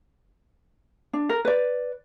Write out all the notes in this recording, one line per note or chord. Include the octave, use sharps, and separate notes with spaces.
D4
A#4
B4 D5